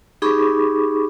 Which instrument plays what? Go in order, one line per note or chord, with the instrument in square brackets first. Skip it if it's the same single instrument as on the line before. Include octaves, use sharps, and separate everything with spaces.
[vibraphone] D#4 G4 G#4 B5 C#6 D6